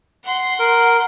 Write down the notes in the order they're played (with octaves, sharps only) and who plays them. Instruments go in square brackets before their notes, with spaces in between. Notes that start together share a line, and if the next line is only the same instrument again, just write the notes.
[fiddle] F#5 C6
[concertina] A#4